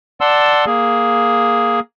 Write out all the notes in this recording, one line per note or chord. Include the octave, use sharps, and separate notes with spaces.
D5 F#5 A5 C6 E6
A#3 G#4